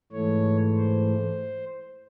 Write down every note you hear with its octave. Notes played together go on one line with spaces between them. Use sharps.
G#2 E3 A3 C#5
C5